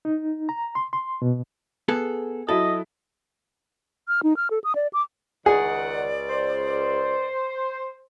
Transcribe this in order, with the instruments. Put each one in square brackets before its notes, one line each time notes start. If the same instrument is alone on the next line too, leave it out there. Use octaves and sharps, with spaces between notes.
[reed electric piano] D#4
A#5
C6
C6
B2
[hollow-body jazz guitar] B3 G#4 A4
[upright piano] F#3 E4 [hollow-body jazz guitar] A4 [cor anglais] D#5
[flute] F6
D#4
F6
A4
D#6
D5
D6
[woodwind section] C#2 D5 [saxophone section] D#3 F#5 [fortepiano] G#4
[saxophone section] C5